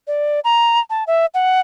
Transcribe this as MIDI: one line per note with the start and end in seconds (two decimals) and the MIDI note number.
0.07 0.40 74
0.44 0.79 82
0.90 1.04 81
1.07 1.26 76
1.34 1.60 78